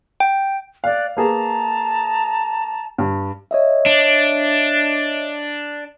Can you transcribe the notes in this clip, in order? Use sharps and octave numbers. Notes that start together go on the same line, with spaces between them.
G5
D5 F5 F#6
A#3 G#4 B4 A5 A#5
G2
C#5 D#5 E5
D4